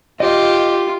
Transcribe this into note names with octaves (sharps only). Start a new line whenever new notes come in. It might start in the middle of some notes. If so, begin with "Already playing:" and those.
F4 G4 D#5